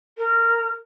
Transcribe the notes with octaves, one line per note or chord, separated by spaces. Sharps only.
A#4